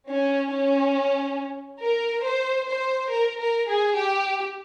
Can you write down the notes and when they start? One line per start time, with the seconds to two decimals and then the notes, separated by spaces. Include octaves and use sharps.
0.08 C#4
0.51 C#4
1.81 A#4
2.25 C5
2.68 C5
3.11 A#4
3.40 A#4
3.68 G#4
3.98 G4